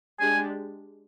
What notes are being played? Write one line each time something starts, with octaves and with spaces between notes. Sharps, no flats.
G#3 D4 G4 G#5